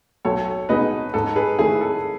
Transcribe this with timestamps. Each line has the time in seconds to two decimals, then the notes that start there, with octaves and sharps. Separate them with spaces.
0.25 B1 A4 C#5
0.69 B2 G#3 D#4 G#4 B4 D#5
1.14 G#2 A4
1.36 G#4 B4
1.58 D#3 A3 E4 G#4
1.81 A4